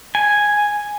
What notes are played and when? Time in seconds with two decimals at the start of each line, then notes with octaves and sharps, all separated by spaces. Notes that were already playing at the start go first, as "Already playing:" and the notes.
0.15 G#5